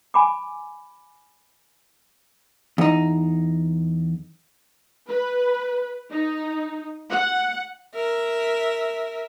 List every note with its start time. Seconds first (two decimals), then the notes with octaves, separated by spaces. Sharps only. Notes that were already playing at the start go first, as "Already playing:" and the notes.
0.14 G#5 B5 D6
2.78 E2 D#4
5.09 B4
6.11 D#4
7.11 F#5
7.94 A#4 E5